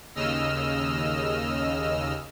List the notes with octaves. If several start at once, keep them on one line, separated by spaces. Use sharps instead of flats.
D#2 C#3 D#5 E6 F6